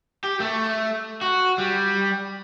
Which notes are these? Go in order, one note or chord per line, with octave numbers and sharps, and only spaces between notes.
G4
A3
F#4
G3